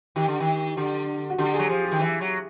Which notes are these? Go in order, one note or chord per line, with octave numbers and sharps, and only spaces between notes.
D#3 G4
D3
D#3
D3 G4
F#4
D3 G4
F#3 G#4
F3 G4
G4
D#3
E3
F#3